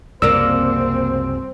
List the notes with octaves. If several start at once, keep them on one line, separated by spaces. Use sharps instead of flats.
C2 F#2 C#3 A#3 C4 D5 E6